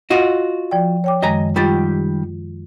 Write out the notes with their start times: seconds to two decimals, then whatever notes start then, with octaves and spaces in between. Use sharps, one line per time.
0.10 F4 F#4 D#5
0.71 F3 D5 G5
1.04 C#5 G5 D6
1.22 F#2 D#3 G#3 D#5 G#5 A#5
1.56 D#3 G3 F4 G4 A6